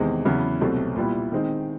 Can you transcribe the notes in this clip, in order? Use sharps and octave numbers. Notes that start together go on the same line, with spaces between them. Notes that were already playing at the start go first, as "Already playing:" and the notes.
Already playing: E2 C3 D#3 G#3 C4
E2 C#3 F#3 B3 E4
C2 B2 F#3 A3 C4
A#2 G3 B3 E4
D#3 G#3 C4 D#4